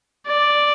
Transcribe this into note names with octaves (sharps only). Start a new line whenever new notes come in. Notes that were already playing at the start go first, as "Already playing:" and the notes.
D5